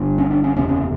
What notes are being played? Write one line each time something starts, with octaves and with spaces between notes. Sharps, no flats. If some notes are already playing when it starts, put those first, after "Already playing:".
Already playing: G1 G2 D3
C#4
D4
C#4
F#1 E2 C3 C#4
C#4